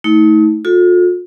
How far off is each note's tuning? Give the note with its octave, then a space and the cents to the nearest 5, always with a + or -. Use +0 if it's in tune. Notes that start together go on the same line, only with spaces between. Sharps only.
A3 +0 D#4 +40
F4 +40 A4 +0